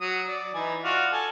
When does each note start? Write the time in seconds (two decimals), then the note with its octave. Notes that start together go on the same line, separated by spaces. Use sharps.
0.01 F#3 D#6
0.28 D5
0.54 E3 D#4 G#5
0.84 F4 F#4 D5
1.12 A4 G#5